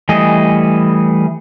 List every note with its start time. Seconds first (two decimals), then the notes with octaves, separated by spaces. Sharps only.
0.09 E3 G3 A3 G#4 D#5